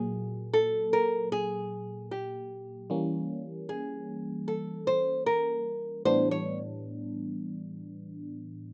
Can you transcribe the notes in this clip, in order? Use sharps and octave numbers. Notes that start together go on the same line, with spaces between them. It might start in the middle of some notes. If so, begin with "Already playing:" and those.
Already playing: A#2 F#3 A#3 G#4
A4
A#4
G#4
G4
E3 G3 A#3 C#4
G#4
A4
C5
A#4
A2 E3 G3 B3 D4 C5
C#5